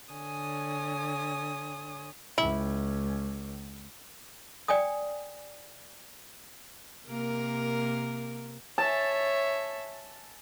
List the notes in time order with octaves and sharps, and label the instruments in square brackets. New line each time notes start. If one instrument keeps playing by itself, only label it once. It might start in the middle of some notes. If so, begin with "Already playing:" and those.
[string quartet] D3 C#5 G#5 D#6
[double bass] C#2 [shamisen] E4
[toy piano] D5 G5 G#5 D#6
[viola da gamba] C3 A#3 A#4
[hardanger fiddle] C#5 E5 [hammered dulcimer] A5